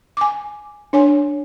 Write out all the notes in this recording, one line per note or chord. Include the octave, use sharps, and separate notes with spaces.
G#5 D6
D4 C#5 G#5